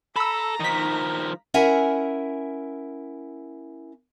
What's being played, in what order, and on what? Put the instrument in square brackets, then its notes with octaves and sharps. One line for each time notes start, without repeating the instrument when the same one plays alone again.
[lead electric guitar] A4 [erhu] A#5 [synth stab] B5 E6
[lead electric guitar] D#3 F3 [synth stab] D#4 B6
[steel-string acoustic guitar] C#4 E4 A#4 E5 F#5 G#5